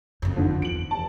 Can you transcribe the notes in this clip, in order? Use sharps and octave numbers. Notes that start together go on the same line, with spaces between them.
F#1 F2
D3 D#3 F3
E2 D7 F#7
F1 A5